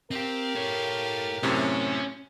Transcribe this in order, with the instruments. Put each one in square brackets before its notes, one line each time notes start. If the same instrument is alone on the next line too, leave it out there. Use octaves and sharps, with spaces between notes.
[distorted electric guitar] C4 [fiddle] G4 F5 [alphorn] A#4
[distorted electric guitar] A4 C#5
[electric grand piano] F#2 A2 C3 [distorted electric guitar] C#4